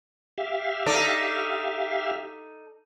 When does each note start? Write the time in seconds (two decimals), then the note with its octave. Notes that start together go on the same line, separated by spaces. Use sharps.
0.38 G4 E5 F5
0.86 D#4 A4 D5